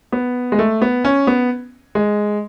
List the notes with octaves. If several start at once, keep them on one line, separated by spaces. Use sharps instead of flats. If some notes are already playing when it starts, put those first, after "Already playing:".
B3
G#3
A3
B3
C#4
B3
G#3